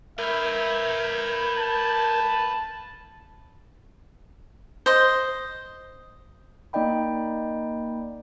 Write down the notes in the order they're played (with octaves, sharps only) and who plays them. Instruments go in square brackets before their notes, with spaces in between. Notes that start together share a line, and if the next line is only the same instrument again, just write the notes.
[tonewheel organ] A#4 G6 G#6 [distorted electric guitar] B4 F5 [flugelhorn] E5
[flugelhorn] A5
[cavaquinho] C5 D#5
[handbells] A#3 D#4 D5 D#5 G5 B5